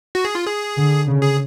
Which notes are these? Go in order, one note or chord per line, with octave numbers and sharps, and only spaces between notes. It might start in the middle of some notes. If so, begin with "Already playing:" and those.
F#4
G#4
F4
G#4
D3
C#3
G#4